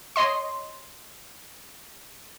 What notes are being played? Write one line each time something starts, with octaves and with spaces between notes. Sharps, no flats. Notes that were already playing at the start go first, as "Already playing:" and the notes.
C#5 D#5 C6